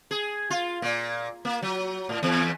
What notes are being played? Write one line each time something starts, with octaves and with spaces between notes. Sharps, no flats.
G#4
F4
A#2
A#3
F#3
A2
E2